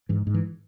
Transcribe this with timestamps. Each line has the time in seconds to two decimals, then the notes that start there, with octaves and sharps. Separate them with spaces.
0.09 G#2 E3
0.27 G#2
0.34 E3